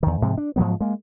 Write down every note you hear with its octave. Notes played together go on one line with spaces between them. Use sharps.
E2 D#3
G#2 C3 F3 G#3
D4
G#2 F3 F#3 B3
G#3 A#3